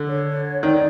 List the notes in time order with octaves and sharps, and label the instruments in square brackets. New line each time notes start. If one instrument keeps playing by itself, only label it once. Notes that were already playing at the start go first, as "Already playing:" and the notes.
Already playing: [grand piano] D3
[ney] C#5
[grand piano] D#3 [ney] D5